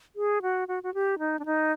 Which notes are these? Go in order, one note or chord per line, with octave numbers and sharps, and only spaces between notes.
G#4
F#4
F#4
F#4
G4
D#4
D4
D#4